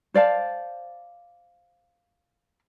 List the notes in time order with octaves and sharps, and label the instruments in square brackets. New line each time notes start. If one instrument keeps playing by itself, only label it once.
[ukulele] C5 D5 F5 A5